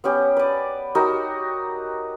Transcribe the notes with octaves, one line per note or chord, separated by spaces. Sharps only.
B3 C#4 G4
B4 D5
D#4 F#4 G4 A#4